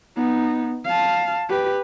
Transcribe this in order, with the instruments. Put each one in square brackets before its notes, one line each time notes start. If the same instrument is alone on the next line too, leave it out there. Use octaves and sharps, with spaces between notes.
[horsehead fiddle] B3 D#4
F5 A5
G4 B4